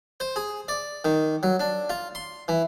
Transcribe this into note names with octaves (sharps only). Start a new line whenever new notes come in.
C5
G#4
D5
D#3
F#3
D4
F4
C6
E3